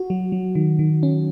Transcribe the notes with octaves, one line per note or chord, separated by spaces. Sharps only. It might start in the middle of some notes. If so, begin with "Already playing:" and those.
Already playing: F#4
F#3
F#3
D#3
D#3
C#4